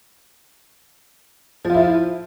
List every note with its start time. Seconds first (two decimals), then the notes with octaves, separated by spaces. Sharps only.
1.65 F3
1.70 F4
1.74 E4